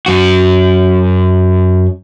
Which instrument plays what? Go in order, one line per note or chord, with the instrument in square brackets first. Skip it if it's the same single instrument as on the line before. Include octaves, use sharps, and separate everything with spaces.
[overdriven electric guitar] F#2 F#4